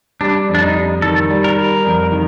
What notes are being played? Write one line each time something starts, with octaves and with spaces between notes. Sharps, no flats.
G3 D4
F2
D4
D#4
G3
D#3 A4
G3
A#4
G3
F2
D#3